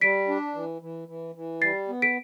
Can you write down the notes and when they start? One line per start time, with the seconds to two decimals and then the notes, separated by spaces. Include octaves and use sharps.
0.01 G3 B6 D7
0.28 D4
0.55 E3
0.82 E3
1.08 E3
1.35 E3
1.62 G3 A6 C7
1.88 B3
2.02 B6 D7